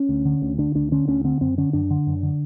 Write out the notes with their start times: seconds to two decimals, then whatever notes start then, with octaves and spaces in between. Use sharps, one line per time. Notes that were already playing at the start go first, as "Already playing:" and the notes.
Already playing: C#4
0.09 D2
0.25 D3
0.42 D2
0.58 D3 D4
0.75 D2 D4
0.92 D3 C#4
1.08 D2 C#4
1.24 D3 C4
1.41 F#2 C4
1.58 D3 C#4
1.73 F#2 D4
1.90 D3
2.07 F#2
2.23 D3